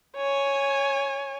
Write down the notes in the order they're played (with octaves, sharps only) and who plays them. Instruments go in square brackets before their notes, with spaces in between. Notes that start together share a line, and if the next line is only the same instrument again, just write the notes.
[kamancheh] C#5 G#5